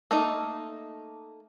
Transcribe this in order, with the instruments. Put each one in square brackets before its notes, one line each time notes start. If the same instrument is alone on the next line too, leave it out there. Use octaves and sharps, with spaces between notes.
[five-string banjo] A3 A#3 D#4